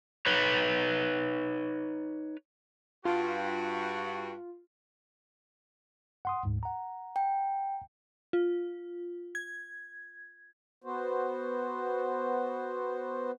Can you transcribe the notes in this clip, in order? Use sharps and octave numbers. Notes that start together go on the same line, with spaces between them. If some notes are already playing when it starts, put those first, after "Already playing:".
D#4 B4 C#5
G2 F4 F#4
F#5 C6 D#6
D2 G#2
F#5 A#5
G5
F4
G#6
B3 F#4 C5